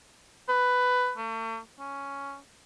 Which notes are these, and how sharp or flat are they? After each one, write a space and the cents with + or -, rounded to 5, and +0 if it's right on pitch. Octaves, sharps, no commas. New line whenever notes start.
B4 +10
A3 +40
C#4 +5